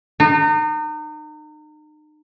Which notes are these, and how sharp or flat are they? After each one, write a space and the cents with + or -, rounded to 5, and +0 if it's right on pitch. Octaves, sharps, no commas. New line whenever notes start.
D#4 -35